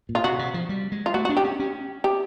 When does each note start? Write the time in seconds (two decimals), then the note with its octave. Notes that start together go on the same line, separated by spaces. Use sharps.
0.09 A#2
0.15 F4
0.24 C3 F#4
0.39 C3
0.54 F3
0.69 G3
0.92 G#3
1.06 F4
1.14 A3 F#4
1.25 F#4
1.29 D4
1.37 G4
1.44 C#4
1.59 C#4
2.04 G4